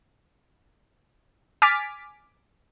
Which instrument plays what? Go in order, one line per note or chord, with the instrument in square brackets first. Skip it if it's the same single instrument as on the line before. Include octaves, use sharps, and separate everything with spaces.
[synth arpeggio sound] G#5 D6 F6 A6 B6